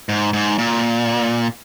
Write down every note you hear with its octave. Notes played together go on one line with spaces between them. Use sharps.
G#2
G#2
A#2